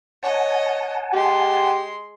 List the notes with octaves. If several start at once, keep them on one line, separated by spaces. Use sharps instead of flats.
C#5 D#5 F#5 G#5 A5
G#3 G4 C6